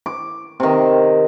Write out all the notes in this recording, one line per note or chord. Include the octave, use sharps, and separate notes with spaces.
D6
C3 D#3